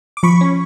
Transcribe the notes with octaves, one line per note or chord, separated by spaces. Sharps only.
D6
F3 B5 C#6
C#4